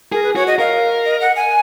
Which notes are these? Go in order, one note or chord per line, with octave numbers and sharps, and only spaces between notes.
G#4 A#4
B4
F#4 C#5
D#5
A#4 F5
D#5
F#5
G#5